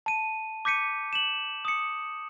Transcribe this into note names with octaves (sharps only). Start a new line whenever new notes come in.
A5 D#7
D6 G6 B6 C#7 D#7
E7 F#7
D#6 C#7